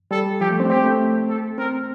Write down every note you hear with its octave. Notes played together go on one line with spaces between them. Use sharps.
G3 A4
F3 G4
A3
C4
D4
C4 G4
A3
A4
C4 A#4